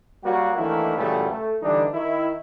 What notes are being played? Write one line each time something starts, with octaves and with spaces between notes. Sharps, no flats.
F#3 G3 A#3 F#4
D#3 E3 A3 A#3 D4 E4
A#2 C#3 E3 F#3 G3 A3
A3
D3 E3 G3 D4 D#4
D#3 E4